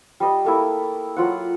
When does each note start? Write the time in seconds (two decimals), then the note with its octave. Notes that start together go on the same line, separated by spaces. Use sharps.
0.20 G3 D#5
0.45 A3 A#3 E4
1.16 F#3 F4 F#5